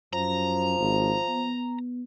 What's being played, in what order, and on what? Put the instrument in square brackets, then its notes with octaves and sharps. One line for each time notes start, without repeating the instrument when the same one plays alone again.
[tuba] F#2 [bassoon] F3 [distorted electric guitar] A#5
[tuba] G#1
B3